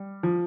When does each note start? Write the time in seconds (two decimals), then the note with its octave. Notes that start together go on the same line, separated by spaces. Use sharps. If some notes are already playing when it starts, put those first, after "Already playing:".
Already playing: G3
0.23 F3